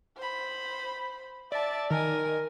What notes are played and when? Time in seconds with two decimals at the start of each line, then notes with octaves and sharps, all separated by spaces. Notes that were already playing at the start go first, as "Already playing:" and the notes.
0.17 C5 B5
1.52 D5 E5 A5
1.90 D#3 A#4 G#5